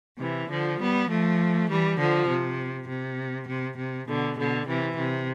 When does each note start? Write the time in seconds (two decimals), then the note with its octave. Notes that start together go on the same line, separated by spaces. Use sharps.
0.19 C3 E3
0.48 D3 F3
0.79 G3 B3
1.08 F3 A3
1.68 E3 G3
1.98 D3 F3
2.28 C3
2.88 C3
3.48 C3
3.77 C3
4.07 B2 D3
4.37 B2 D3
4.67 C3 E3
4.96 C3